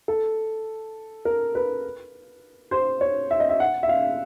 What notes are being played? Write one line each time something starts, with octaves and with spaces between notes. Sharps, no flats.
A4
A#4
B4
C5
C#5
E5
D#5
E5
F#5
E5
F5